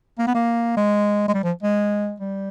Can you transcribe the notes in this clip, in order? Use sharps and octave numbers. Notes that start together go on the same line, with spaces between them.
A#3
B3
A#3
G#3
G#3
G3
F3
G#3
G3